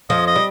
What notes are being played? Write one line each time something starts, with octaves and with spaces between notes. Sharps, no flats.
F2 F3 D#5
D#5
G3